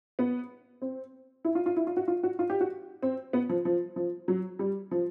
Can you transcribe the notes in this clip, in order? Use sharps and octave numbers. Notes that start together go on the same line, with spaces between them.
B3
C4
E4
F4
F4
E4
F4
F#4
F4
F#4
F4
G4
F#4
C4
B3
F3
F3
F3
F#3
G3
F3